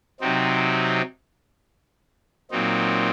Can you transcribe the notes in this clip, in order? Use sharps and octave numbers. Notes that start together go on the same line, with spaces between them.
C3 F#3 C4 D#4
A#2 F#3 C4 D#4